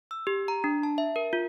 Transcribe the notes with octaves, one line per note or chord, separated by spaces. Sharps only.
E6
G4
A#5
D4
A5
E5
A#4
F4